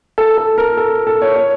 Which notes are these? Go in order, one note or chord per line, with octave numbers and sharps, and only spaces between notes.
A4
A4
A#4
A4
A4
C#5
C#5